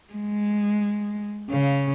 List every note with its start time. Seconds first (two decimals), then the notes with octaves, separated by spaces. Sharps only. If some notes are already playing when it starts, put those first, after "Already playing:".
0.12 G#3
1.50 C#3